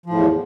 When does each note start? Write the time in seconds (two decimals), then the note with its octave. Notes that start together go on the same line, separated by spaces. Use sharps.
0.06 F3
0.10 A2
0.13 E2